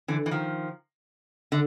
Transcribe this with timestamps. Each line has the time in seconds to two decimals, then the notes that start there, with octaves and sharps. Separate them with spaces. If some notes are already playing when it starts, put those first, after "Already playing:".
0.08 D3 E3
0.26 E3
0.31 D#3 F3
1.52 D3